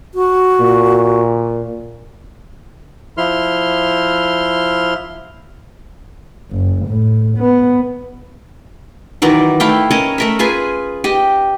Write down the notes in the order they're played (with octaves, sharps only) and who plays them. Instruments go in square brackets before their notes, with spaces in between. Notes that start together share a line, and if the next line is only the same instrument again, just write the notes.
[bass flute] F#4
[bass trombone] A#2
[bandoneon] F3 E4 C6 F6
[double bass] F#1
A2
B3
[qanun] D#3 E3 F#3 D5
A3 E4 F5 G5
C#4 A#4 C#5 D#5
A3 A#4 E5
F4 G#4 B4 G#5
G4 D#5